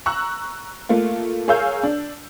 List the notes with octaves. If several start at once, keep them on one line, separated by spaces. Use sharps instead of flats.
A#5 C#6 E6 F#6
A3 A#3 F4
G#4 A#4 C#5 F5 E6 G6
D4